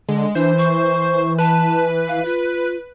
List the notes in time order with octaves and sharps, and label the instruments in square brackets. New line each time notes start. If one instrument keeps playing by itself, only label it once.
[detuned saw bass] D3 [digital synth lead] G#3
[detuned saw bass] E3 [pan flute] D4 [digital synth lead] C5
[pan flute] C#6
[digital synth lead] B4 [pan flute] A5
[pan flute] F5
F4